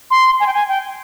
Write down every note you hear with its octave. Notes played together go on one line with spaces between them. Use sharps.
C6
G#5
G5
G#5
G5